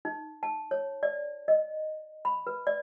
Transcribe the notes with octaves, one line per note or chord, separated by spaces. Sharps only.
D#4
A5
C#5
D5
D#5
B5
B4
D5